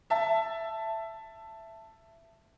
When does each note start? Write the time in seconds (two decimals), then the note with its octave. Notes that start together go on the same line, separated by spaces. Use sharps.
0.10 E5 A5